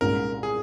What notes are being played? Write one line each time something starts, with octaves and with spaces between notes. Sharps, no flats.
C2 A#2 G#3 C#4 F4 A#4
G#4